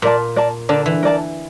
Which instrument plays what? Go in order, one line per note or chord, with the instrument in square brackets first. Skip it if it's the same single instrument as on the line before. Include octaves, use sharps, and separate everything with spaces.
[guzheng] A#2 [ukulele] A#4 D5 A5
[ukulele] A#4 D5 A5
[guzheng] D3 [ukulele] A#4 D5 A5
[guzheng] E3
[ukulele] A#4 D5 A5